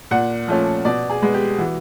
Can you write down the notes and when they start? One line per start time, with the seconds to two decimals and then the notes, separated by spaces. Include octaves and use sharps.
0.11 A#2 F#5
0.48 F3 A3 C#4
0.85 B2 D5
1.10 G#4
1.22 G#3 B3
1.34 G4
1.58 E3 F#4